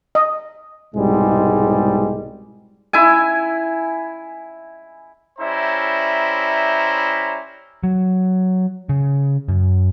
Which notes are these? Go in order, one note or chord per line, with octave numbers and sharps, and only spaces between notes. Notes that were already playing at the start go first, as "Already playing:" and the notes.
D#5
C2 G#2 B2 G3 G#3
E4 G#5
G3 C#4 E4 C5 E5 A#5
F#3
C#3
F#2